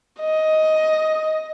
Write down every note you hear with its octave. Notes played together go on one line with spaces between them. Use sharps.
D#5